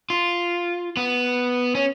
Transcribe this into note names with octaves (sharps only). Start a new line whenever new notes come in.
F4
B3
C#4